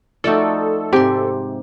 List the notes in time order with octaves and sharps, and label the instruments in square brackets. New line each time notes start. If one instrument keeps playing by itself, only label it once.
[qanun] F3 A3 D#4 [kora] F#4 D5 [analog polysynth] A4
[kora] G#2 C3 [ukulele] G4 [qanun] G#5 C6